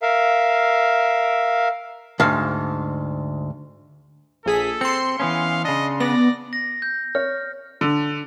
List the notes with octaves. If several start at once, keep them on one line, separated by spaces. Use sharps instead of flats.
A#4 E5 F5
D2 G#2 F5
A#1 G#4 A4 B6
C4 C6 C#7
E3 B3 C#4 F5
C#3 D4 D#5
B3 D5 A#6
A#6
G6
C#5 F6
D3